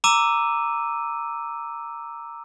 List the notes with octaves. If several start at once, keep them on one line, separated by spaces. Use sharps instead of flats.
A#5 D6 E6 D#7